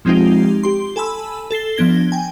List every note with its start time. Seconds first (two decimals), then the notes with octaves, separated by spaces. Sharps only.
0.05 F3 G#3 C4 D#4 F4 G4
0.63 G4 C6
0.96 A4 G#5 A5 B5 E6
1.51 A4 A6 C7 G7
1.76 F3 B3 D4 G#6 A#6 G7
2.12 G5 G#5